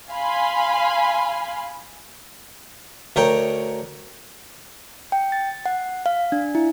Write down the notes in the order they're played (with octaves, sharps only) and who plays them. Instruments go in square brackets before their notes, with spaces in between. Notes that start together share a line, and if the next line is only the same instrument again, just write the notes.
[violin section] F5 G#5 B5 C6
[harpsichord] D2 A#4 C#5 G5 A#5
[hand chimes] G5
A6
F#5
F5
D4
E4